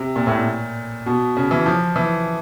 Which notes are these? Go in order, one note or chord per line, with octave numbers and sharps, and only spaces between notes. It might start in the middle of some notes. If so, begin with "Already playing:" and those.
Already playing: C3
A#2
A2
A#2
B2
C#3
E3
F3
E3